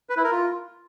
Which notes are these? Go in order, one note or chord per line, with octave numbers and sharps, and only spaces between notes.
B4
E4
A#4
F4